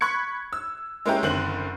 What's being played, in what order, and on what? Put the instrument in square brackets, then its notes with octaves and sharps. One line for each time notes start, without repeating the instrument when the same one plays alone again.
[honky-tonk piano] B5 C#6 F#6 G#6 C#7
E6
G#3 A#3 C#4 E4 G4 A#4
F#1 D3 D#3 C4 F#6 F#7